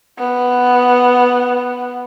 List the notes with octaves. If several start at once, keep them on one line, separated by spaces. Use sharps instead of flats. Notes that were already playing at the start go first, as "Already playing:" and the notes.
B3